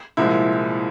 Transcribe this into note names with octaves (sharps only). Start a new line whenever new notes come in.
C2 A#2 F3 G#3 E4